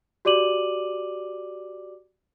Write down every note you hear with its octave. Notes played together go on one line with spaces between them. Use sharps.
F#4 G4 D5 D6 D#7 F#7